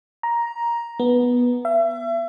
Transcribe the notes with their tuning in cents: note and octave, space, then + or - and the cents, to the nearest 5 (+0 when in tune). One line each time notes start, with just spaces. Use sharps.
A#5 +10
B3 -10
E5 +35